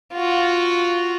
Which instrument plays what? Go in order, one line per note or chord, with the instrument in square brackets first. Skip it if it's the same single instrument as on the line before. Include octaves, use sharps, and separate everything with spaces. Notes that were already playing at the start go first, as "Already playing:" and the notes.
[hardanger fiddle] F4 F#4